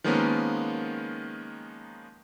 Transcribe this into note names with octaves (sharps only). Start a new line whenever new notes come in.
D#3 F3 G#3 A#3 B3 C#4